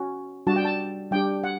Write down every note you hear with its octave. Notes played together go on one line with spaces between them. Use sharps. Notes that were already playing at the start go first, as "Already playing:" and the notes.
Already playing: C#4 F#4
G3 D4 F#4 A5
G5
A5
G3 D4 G4 G5
F#5